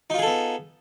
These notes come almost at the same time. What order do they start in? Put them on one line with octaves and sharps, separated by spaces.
D#4 F4 G#4 A4 B3